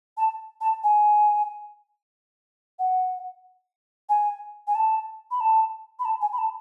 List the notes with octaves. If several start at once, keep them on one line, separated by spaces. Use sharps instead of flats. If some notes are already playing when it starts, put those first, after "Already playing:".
A5
A5
G#5
F#5
G#5
G#5
A5
B5
A5
B5
A5
G#5
B5
A5